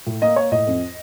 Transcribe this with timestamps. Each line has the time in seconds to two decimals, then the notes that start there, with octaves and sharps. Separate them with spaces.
0.07 A2
0.22 A#3 D#5
0.36 A#3 C#5
0.52 A2 D#5
0.67 F2